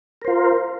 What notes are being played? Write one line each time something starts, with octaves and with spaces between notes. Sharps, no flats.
F4 A#4 C5